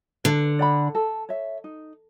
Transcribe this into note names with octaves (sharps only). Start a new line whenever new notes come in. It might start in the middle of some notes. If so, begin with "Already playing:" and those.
D3 B4
D5 F#5 B5
A4
C#5 E5
D#4